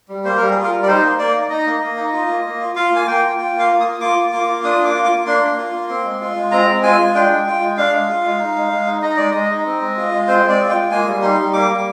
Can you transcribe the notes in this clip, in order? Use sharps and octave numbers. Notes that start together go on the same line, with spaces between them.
G3
A#3 C5
G3 A#4
G#4
F4
A#4
G3
D5
D#4 C5
A#3
A#3 D5
D#4
D#4 D#5
A#3
A#3
D#4
F4
A#3
A#3
F4
F4 F5
A#3 G#5
A#3 G5
F4
F4 G5
A#3
F5
A#3
F4 D#6
F4 D6
A#3
A#3 D6
F4
D4 D#6
A#3 D6
F4
D6
A#3
D4 C6
A#3
F4
A#3
C4
G#3
F4
G#3
C4 A#5
G#3
F4 G#5
G#3
D4 G5
G#3
F4
G#3
D4 F5
G#3
F4
G#3
D#4
G#3
G#3
D#4
D#4 D#5
G#3 D5
G#3 D#5
D#4
C4
G#3
F4
G#3
C4 C5
G#3
D5
F4
G5
G#3
A#3 G#5
G3
D#4 C6
G3
A#3 D6
G3